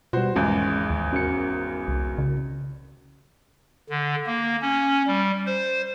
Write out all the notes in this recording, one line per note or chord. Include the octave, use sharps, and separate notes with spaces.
B2 G3 F#4 B4 C5
G#1 E2 G#3 C#4
D#2
C#4 F#4 A#4 C#7
C2
C#3
D3
A#3
C#4
G3
C5